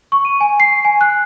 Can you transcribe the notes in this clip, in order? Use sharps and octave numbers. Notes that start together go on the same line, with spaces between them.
C#6
D#7
G#5
C7
G#5
F#6